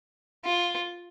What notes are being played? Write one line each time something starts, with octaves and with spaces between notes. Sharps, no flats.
F4